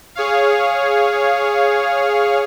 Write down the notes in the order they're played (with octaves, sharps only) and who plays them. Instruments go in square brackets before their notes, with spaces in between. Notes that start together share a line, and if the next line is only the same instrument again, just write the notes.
[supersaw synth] G#4 C#5 F5